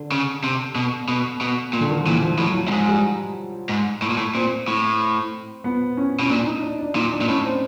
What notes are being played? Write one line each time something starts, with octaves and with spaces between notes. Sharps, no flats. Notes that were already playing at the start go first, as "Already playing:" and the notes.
Already playing: D3
C#3
C3
B2
B2
B2
A#2
D3
D#3
F3
A#2 E3
F3
A2 F#3
F#3
G2
G#2 F3
G3
G#2
A2
A#2
A2
A#2 C4
A2
B3
C#4
B2 C#4
A#2 D4
D#4
D4
D4
A#2 D#4
D4
A#2
A2 C#4
C4